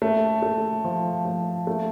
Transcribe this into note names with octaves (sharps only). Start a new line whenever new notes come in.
A3
A3
F3
A3
A3